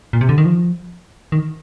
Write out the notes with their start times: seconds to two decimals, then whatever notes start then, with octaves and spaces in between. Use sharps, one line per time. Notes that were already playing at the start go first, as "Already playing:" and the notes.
0.13 A#2
0.21 C3
0.29 D3
0.38 D#3
0.45 F3
1.32 D#3